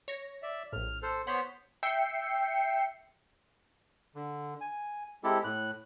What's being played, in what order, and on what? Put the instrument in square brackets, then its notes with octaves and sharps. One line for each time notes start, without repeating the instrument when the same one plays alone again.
[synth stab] C#5 A#6
[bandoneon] D5 E5
[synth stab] A#1 A2 [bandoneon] F6
[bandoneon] A4 C5
[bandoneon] B3 C5 C#5 [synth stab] F#5 C6 B6
[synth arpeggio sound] E5 G5 C7 C#7
[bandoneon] D3
G#5
G#3 C4 E4 G4 A4
A2 F#6